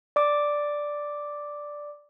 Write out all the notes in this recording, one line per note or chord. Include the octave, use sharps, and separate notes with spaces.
D5 D6